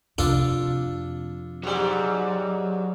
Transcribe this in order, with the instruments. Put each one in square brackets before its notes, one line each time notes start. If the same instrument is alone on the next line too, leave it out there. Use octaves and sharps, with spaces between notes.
[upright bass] F2 C3 [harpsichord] D4 F4 A4
[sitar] G#2 G3 [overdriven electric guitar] F#3